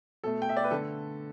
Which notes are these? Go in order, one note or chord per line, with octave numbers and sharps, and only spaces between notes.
B2 A3 A4
G5
E5
D5
B4
D3 A3 A4